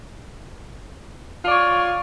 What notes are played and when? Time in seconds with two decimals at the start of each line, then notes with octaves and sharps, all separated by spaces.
1.43 F4
1.47 D5
1.50 C#5